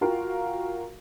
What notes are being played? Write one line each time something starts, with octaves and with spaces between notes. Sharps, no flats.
F4 F#4 A#4 F5 G5